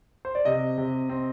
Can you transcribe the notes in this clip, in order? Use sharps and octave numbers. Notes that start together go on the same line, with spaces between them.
C5
D5
C3 D#5
C3
C4